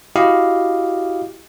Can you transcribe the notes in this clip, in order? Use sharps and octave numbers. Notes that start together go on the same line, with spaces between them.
E4 F#4 G4 D#5 F5